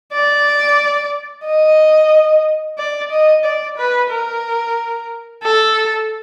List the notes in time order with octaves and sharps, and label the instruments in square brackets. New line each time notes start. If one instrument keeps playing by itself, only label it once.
[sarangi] D5
D#5
D5
D#5
D5
B4
A#4
A4